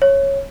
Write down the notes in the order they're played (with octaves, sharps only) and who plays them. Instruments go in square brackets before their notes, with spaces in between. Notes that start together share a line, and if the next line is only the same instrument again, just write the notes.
[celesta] C#5